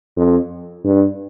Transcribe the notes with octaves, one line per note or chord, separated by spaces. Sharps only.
F2
G2